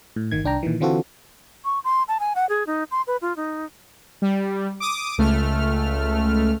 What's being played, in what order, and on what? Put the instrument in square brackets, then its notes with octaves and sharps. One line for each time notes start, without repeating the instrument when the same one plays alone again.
[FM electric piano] A2
G1 D#3 G#6
C2 D4 G5 A#5
A#2 D#3 E3
D3 E3 C4 F4 F#4 A4
[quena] C#6
C6
A5
G#5
F#5
G#4
D#4
C6
B4
F4
D#4
[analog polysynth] G3
D6 D#6
C#2 A3 F6